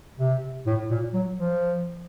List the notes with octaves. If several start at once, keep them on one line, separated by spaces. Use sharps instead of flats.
C3
A2
A#2
F#3
F3